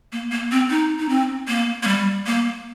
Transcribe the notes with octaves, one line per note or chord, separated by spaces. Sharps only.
A#3
A#3
C4
D#4
D#4
C4
A#3
A#3
G3
A#3